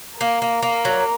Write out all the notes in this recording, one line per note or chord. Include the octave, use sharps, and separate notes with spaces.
A#3 A#4
A#3
A#3
F#3